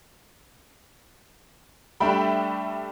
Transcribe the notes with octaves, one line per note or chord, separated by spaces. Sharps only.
G3 A3 D4 E5 G5 B5